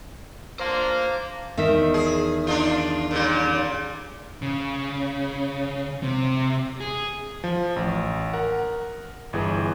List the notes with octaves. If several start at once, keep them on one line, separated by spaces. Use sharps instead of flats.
A#3 D4 F4 C5
E2 D#3 E5
G#4
D4 D#4 F4
A#2 C#3 G3
C#3
C3
G#4
F3
A1
A#4 F#5
G1 E3 G#4